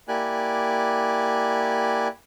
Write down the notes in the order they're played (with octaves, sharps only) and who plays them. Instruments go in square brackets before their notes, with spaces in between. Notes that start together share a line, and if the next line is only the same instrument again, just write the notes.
[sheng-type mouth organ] A#3 E4 G4 D5 G#5 F#6